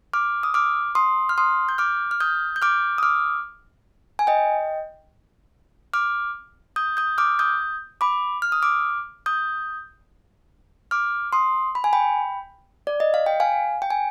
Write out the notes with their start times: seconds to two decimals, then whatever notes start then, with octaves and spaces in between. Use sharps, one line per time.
0.14 D6 F6
0.43 D#6
0.54 D6 F6
0.95 C6 D#6
1.29 F6
1.38 C6 D#6
1.69 G6
1.78 D6 F6
2.11 F6
2.20 D#6 G6
2.56 G6
2.62 D6 F6
2.98 D#6
3.03 D6 F6
4.19 G#5
4.27 D#5 G5
5.93 D6 F6
6.76 D#6 G6
6.97 D#6 G6
7.18 D6 F6
7.39 D#6 G6
8.01 B5 D6
8.42 F6
8.52 D#6
8.62 D6 F6
9.26 D#6 G6
10.91 D6 F6
11.33 C6 D#6
11.75 B5
11.84 G#5
11.93 G5 B5
12.87 D5
13.00 D#5
13.14 F5
13.26 G5
13.40 F5 G#5
13.82 G5
13.90 G#5